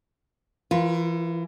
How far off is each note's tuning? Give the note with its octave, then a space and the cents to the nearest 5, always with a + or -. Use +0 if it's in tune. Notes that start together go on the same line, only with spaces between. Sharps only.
E3 +30 F4 +0 A#4 +25